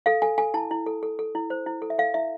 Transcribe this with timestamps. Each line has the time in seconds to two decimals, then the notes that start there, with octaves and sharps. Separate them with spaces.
0.06 A4 F5
0.22 A4 G#5
0.38 A4 G#5
0.54 E4 A5
0.71 E4
0.86 A4
1.03 A4
1.19 A4
1.35 E4
1.50 C5
1.66 E4
1.82 A4
1.90 E5
1.98 A4 F5
2.14 E4 E5